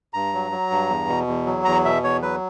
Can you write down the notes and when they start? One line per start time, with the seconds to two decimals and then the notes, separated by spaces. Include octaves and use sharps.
0.14 G2 A#5
0.33 F#3
0.51 F#3
0.71 G2
0.89 E2
1.08 B2
1.27 E2
1.46 F#3
1.65 E2 A#5
1.85 B2 E5
2.03 E2 C#5
2.22 F#3 B4